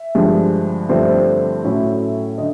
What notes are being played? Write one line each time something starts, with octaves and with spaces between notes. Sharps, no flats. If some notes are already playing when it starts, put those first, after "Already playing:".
Already playing: E5
G2 D3 F3 G#3
G2 D3 F3 A3 C4
A2 F#3 A3 C#4 E4
D3 D#5